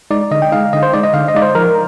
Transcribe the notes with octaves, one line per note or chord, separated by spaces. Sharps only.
G#3 D#4 D5
D3 D#5
G5
G#3 D#4 F5
D3 D#5
C5
G#3 D#4 D5
D#5
D3 F5
D#5
G#3 D#4 D5
C5
F3 A#4